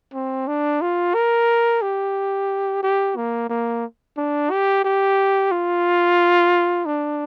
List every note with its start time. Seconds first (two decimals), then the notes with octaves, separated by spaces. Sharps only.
0.13 C4
0.48 D4
0.81 F4
1.14 A#4
1.82 G4
2.83 G4
3.17 A#3
3.50 A#3
4.17 D4
4.51 G4
4.84 G4
5.51 F4
6.86 D4